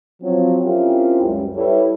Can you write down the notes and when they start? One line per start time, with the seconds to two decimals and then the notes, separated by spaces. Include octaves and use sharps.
0.22 F3 F#3 C4
0.63 C4 C#4 E4 F4 G4 A#4
1.21 C#2 F#2 G3
1.56 G3 E4 A4 B4 C#5 E5